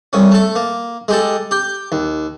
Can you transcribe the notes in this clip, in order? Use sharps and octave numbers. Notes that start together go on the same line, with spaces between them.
C2 C#4
A3 A4
A#3
G#3 G4 A4
G4 G5
D#2